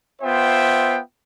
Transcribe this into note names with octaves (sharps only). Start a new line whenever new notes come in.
B3 F4 C5 E5 G5